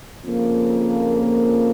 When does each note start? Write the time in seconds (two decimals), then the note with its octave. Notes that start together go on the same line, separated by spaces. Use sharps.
0.25 F2 C#3 F3 A#3